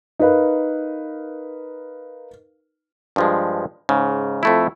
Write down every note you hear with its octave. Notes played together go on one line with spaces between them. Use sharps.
D#4 A#4 B4 F5
G2 F3 G#3
G#2 C#3
F2 A3 E4